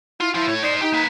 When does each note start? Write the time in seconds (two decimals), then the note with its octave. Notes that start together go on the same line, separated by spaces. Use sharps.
0.20 E4 F4
0.34 E4 F4 C5
0.47 A2 C#5
0.62 D#4 C5 D5
0.82 D#4 G4 G5
0.93 A#3 B4